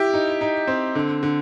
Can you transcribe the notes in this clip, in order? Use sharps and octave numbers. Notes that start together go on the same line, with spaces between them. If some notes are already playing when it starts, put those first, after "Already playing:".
Already playing: E4 G4
D#4
D#4
C4
D3
D3